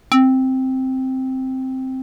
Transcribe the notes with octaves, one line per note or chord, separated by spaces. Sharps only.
C4